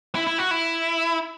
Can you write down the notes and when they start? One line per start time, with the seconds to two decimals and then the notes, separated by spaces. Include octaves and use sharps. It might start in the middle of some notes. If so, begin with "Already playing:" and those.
0.15 E4
0.27 E4
0.38 F#4
0.51 E4